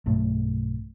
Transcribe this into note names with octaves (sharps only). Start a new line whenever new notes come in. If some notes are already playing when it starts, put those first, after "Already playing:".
B1 G2 A3